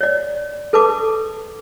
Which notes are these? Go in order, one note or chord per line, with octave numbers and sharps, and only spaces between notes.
C#5 D5
A4 B4 A5 D6